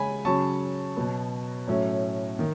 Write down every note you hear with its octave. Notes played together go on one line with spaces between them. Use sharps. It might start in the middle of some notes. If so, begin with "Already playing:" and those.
Already playing: C#3 G#3 C#4 G#5 B5
C#3 F#3 C#4 A5 C#6
B2 F#3 B3
A2 F#3 A3 C#4
D#3